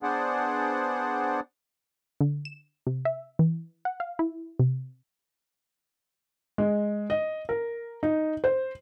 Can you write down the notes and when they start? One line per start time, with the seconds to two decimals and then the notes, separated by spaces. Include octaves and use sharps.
0.03 B3 D4 G#4 C5 D5 F#5
2.21 D3
2.45 E7
2.87 C3
3.05 E5
3.39 E3
3.85 F#5
4.00 F5
4.19 E4
4.59 C3
6.58 G#3
7.10 D#5
7.49 A#4
8.03 D#4
8.44 C5